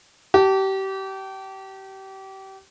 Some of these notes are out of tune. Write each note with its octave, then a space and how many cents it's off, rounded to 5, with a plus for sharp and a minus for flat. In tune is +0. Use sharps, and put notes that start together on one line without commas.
G4 -30 A5 +0